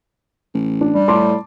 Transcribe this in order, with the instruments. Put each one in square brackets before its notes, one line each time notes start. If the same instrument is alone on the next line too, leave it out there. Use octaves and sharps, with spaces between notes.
[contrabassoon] A1
[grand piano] D4
[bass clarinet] G3
[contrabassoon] A2 [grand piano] A5 C6 D6